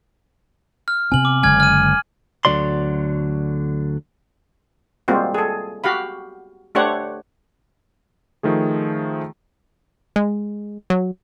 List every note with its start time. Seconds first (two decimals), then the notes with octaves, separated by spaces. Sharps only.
0.88 F6
1.12 C3 B3 G#5 F#7
1.25 D6
1.43 F#1 D3 G#3 G#5 F6 G#6
1.60 F6 D#7
2.45 D2 D3 F3 F#3 D5 C6
5.08 G3 G#3 A#3 C4 F4 F#4
5.34 G#4 A4
5.84 F#4 G4 F5 B5
6.75 A3 D4 G4 C5 C#5 F#5
8.43 D#3 F3 A3 G#4
10.16 G#3
10.90 F#3